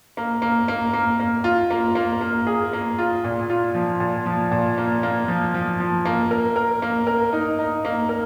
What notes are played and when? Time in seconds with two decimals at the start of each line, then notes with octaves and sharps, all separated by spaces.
0.17 A#3
0.42 A#3
0.68 A#3
0.93 A#3
1.20 A#3
1.44 F4
1.71 A#3
1.95 A#3
2.21 A#3
2.47 G#4
2.73 A#3
2.98 F4
3.24 A#2
3.49 F4
3.75 F3
4.00 A#2
4.26 F3
4.52 A#2
4.78 A#3
5.03 A#3
5.28 F3
5.54 F3
5.80 F3
6.05 A#3
6.31 A#4
6.56 A#4
6.82 A#3
7.07 A#4
7.33 D#4
7.59 D#4
7.85 A#3
8.09 A#4